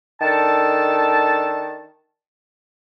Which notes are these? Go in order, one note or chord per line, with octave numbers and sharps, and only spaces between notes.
D#3 D4 A4 A5